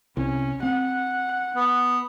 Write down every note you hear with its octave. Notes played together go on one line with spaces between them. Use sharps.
C2 C#4
C4 F#5
B3